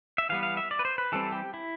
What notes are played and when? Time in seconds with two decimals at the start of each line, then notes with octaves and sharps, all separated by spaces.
0.18 E5
0.29 E3 G3 B3 F5
0.43 F5
0.57 E5
0.71 D5
0.79 B4
0.85 C5
0.98 B4
1.12 E3 G3 C4 A4
1.32 G4
1.54 E4